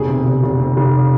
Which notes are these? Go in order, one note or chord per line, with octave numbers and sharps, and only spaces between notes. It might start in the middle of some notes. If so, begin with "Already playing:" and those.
Already playing: F1 B2 G#4
C3
F1
F1
C3
F1